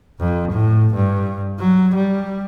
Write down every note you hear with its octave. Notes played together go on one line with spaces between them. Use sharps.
F2
A2
G2
F#3
G3